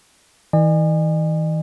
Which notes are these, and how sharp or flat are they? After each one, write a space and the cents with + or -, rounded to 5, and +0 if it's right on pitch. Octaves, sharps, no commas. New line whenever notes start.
E3 -45 D#5 -45 G#5 -30